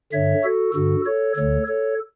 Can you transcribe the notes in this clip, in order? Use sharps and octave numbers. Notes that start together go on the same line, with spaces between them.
G2 D3 C#5 E5
F#4 A4
G2 D3 F#4 A4
A4 C#5
D2 D3 A4 C#5
A4 C#5